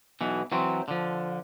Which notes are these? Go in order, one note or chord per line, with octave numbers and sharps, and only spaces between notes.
B1 B2 E3
E3 F#3 C4
D3 F3